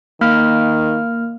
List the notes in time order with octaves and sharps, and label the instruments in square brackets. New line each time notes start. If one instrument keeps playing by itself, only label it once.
[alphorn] D#3 [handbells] A#3 F6